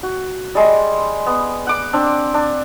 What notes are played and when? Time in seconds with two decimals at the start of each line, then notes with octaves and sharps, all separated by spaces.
0.03 F#4
0.55 G3 G#3
1.27 B3
1.67 F#5 D6
1.93 C4 D4
2.34 D4